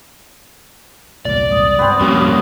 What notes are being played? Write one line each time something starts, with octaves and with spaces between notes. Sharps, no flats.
E1 C2 A#2 D5
C2 G#2 D#6
G2 B3 C4
F2 G3 A#3 C#4 F#4 D6